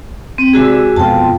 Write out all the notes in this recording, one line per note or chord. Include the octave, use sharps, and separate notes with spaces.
C4
C3 G#3 F#4 G#4 D5 E6
F2 B2 F4 G5 A5